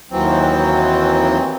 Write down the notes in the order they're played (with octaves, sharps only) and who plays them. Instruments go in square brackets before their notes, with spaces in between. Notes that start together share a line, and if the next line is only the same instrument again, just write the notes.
[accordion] D#2 E3 F#3 C4